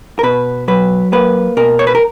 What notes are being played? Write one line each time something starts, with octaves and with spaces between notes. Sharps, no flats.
A#4
B2 B4
F#3 B4
A#3 B4
B2 A#4
C#5
B4
A#4